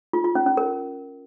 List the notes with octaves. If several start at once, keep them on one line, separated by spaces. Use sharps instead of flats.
F4
F4
C#4
C#4
A#4